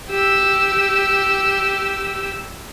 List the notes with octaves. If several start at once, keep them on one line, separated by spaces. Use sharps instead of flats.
G4 E6